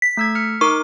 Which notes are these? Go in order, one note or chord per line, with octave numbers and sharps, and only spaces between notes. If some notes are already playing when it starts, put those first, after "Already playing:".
B6
A3 E6 G#6
F6 C#7
D#4 A#4 C#6 D6